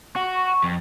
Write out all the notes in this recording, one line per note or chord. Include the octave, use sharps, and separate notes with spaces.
F#4 C#6
F2